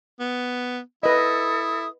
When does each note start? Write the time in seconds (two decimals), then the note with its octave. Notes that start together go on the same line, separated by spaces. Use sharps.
0.20 B3
1.03 E4 A4 B4 D#5 D#6